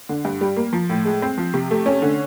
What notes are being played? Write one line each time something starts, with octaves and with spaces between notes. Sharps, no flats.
D3
G2
G3
A#3
F3
A2
G#3
C4
F3
C3
A3
C#4
D3